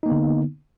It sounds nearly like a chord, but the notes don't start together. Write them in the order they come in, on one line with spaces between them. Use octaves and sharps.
D#4 A#3 B3 D3